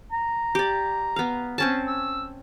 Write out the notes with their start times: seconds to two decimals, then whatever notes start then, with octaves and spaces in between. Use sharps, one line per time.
0.12 A#5
0.55 G4 D5
1.16 B3 F5
1.58 C4 C#4 A5
1.88 E6